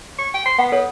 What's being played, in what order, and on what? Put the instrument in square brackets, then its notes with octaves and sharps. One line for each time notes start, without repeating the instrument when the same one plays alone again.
[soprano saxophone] C#6
G5
C6
[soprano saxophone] B3 [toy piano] F#5
[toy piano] A4 C#5